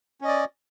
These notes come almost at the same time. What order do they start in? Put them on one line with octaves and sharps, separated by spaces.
C#4 D#5 D5